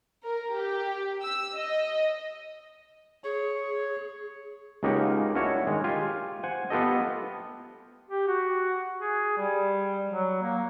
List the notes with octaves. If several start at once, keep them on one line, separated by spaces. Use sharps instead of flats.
A#4
G4
E6
D#5
G#4 C#5
C#2 C#3 A#3 D#4 G4 F#5
C#4 D4 E4 F#4 C#5
D#3 G#3
F4 G4 G#5
C5 F#5 G#5
B3 F4 G4 A4 D#5
G4
F#4
G#4
G3
F#3
A#3